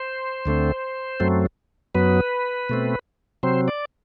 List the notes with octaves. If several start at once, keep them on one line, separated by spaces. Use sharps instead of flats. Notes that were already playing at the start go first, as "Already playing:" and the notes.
Already playing: C5
D2 D3 A3 C4
F#2 F#3 A3 C4
F#2 F#3 B3 B4
B2 A3 C4
C3 F#3 C4 C5
D5